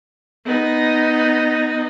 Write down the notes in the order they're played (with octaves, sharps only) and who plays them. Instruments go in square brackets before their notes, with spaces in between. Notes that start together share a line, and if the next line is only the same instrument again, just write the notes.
[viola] B3 D#4